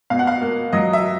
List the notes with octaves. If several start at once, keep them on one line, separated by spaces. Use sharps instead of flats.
B2 F5
F#5
F5
A#3
F#3 D#5
E5